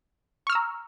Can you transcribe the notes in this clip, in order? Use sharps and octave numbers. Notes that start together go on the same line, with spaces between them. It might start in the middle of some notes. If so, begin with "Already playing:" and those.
A#5 C#6 E6 F6